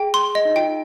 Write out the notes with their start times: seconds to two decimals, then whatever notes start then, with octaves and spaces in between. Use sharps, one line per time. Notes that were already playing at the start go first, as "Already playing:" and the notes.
Already playing: G#4 G5
0.14 C6
0.35 D#5
0.45 D#4
0.56 F4 G5